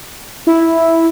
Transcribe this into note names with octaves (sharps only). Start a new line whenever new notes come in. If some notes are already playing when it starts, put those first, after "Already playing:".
E4